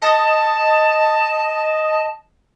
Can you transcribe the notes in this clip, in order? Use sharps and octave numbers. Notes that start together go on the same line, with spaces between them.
D#5 A5